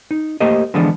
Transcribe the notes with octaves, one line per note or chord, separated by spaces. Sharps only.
D#4
A3 A#3 G4 C5 D#5
D3 E3 F3 G#3 B3 D4